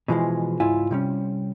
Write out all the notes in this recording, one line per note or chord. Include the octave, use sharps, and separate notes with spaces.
B2 E3 F3 G#3
C#2 G#2 E4 F4 G#5
C3 G3 C#4